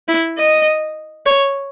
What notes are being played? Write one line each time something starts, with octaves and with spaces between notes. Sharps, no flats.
E4
D#5
C#5